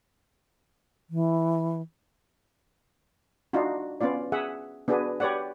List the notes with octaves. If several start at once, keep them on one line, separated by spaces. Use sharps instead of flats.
E3
D4 D#4 F4 F#4
B3 C#4 F4 D5
G#4 E5 F#5
B3 D4 F#4 G#4 B4
G4 B4 C#5 D5 F#5